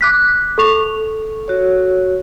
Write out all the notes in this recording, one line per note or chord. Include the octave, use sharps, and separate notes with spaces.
D6 F#6 B6
A4 C#6 F7
F#4 C#5